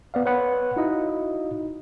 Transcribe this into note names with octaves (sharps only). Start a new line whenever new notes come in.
B3 D5 F5
B4 C#5 F#5 B5
D#4 E4 F#4 D#5 F5